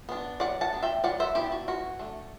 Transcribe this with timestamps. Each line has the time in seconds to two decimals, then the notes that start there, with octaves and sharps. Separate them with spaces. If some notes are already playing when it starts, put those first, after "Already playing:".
0.09 B3 D4
0.40 F#3 D5 F#5
0.61 F#5 A5
0.73 B3 D4
0.83 E5 G5
1.04 F#3 D5 F#5
1.20 C5 E5
1.35 B3 D4 E4 G4
1.52 F#4
1.68 E3 F#4
1.99 A3 D4